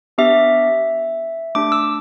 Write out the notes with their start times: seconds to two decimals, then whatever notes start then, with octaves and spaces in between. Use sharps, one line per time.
0.18 B3 D4 G4 E5
1.55 A3 D4 G4 D6
1.72 E6